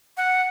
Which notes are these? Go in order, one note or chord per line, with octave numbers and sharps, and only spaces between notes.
F#5